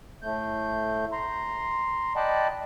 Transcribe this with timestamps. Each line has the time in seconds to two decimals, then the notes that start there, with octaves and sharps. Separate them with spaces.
0.23 A2 A3 G6
1.12 A#5 C6
2.16 D5 D#5 F#5 G5 A5 B5